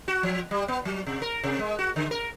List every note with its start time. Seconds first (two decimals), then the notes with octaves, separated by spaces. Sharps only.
0.08 F#4
0.23 F3
0.51 G3
0.68 B3
0.85 F#3
1.07 C3
1.22 A#4
1.43 C3
1.59 G#3
1.79 F#4
1.96 D3
2.11 A#4